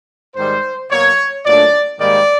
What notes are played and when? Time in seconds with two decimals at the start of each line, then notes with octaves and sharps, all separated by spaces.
0.36 G#2 D#3 G3 C5
0.90 B2 F#3 A#3 C#5
1.45 A#2 F#3 A3 D4 D5
2.00 G#2 D#3 G3 A#3 D5